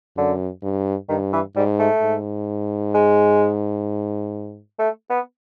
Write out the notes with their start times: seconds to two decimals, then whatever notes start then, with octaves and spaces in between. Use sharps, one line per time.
0.17 F#2 D3
0.63 G2
1.09 G2 D#3
1.33 E3
1.56 G#2 G3
1.79 A3
2.02 G#2
2.94 G#3
4.79 A3
5.10 B3